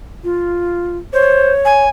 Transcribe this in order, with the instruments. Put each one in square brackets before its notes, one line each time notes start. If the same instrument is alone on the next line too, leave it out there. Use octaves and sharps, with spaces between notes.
[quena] F4
[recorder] C5 [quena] C#5
[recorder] G#5